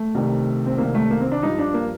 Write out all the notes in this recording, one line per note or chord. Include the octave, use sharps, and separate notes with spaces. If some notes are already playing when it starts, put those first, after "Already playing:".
Already playing: A3
C2 C3 D#3
C4
C2 C3 D#3 A#3
A3
A#3
C4
D4
G2 F3 D#4
D4
A#3